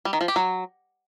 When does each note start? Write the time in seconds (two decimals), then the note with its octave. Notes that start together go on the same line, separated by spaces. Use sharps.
0.05 G3
0.13 D#3
0.21 F3
0.28 G4
0.36 F#3